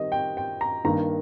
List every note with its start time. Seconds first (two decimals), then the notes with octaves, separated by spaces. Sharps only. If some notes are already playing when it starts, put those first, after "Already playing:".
Already playing: D#3 G3 C4 D#5
0.12 G5
0.37 G5
0.61 A#5
0.84 G2 D#3 A#3 A#5